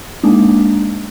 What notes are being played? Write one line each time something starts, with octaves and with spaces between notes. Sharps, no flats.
G#3 A#3 D4 D#4